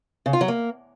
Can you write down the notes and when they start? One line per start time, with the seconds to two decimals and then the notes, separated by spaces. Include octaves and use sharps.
0.26 C#3
0.33 F4
0.41 F#3
0.48 A#3